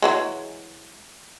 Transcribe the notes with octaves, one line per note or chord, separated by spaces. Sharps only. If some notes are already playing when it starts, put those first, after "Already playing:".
E3 F#3 G#3